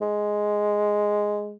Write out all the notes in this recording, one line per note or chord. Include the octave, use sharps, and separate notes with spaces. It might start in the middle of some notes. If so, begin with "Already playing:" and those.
G#3